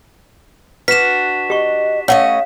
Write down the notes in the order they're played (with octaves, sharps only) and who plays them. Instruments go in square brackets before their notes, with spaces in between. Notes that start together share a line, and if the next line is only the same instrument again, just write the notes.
[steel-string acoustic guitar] D4 F#4 [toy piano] B4 [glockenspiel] B6 E7
[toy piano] G4 C#6 [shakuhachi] D#5
[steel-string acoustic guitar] A3 C#4 D#5 [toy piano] C#5 F#5 [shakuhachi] F5